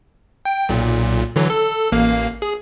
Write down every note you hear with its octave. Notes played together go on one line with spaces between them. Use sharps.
G5
B1 A#2
D3 E3 F#3
A4
A1 A#3 F5
G#4